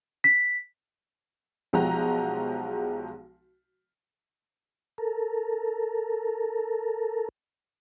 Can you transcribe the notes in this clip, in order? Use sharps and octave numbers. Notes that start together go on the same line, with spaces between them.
B6
B1 F3 G#3 F#4 G4 A#5
A4 A#4